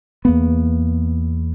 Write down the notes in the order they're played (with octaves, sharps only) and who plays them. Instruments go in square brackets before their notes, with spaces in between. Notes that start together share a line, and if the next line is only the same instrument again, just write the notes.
[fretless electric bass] E2 A#3 B3